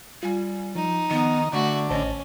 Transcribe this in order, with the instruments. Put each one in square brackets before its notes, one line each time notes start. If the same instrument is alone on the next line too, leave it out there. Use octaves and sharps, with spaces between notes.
[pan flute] G3 [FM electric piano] F4 G#5
[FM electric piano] F3 [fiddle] D#4
[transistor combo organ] D#3 [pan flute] B3
[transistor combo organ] D3 [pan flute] A3 [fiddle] F#4
[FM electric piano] A1 C5 A5 [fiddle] C#4 [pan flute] D#5